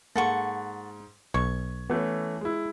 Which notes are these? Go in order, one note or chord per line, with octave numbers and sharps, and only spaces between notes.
G#2 A#3 A4 F#5 C#6
B1 C#6 G#6
E3 A3 B3 C#4
G#3 E4